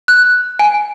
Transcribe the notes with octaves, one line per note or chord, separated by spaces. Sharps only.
F#6
G#5